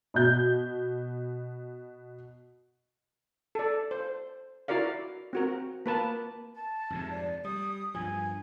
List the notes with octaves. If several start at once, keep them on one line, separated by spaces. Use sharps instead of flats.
B2 G6
A4 D5
C5
E4 F#4 A#4 D5 F5
C4 F#4 A#4
A#3 B4 A5
A5
F2 G#2 C3
D5
G3 D#6
G2 F3 G#5